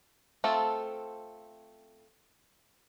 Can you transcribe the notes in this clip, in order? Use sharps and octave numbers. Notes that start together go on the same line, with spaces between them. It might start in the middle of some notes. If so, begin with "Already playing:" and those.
A3 C4 F4 A4